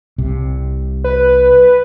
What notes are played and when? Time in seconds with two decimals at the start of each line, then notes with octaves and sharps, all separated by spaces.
0.18 C2 C3
1.04 B4